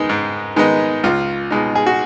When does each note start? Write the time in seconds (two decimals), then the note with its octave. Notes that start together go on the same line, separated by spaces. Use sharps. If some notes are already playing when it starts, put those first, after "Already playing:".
Already playing: D#3 G#3 B3 D#4
0.09 G#2
0.56 D#3 G#3 B3 D#4
1.04 C#2 F4
1.51 B2 G#3 D#4
1.75 G#4
1.86 F#4